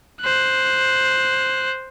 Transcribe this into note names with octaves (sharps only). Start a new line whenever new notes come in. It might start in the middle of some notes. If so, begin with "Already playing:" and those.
C5 F#6